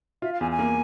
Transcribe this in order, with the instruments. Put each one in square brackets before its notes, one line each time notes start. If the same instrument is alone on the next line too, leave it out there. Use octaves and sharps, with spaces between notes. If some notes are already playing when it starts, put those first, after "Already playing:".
[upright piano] F4 [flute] E5
[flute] F5
[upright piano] E2 [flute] G#5
[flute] G#5
[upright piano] A#3